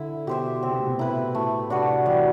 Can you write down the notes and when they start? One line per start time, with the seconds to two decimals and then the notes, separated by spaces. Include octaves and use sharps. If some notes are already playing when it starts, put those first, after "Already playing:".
Already playing: D3 E4
0.27 B2 G4 C5 E5
0.63 C3 C4
0.71 B2
0.78 A2
0.86 B2
0.99 E4 B4
1.35 A2 A3
1.70 C3 D4 F#4 B4
2.06 E3 G3
2.16 F#3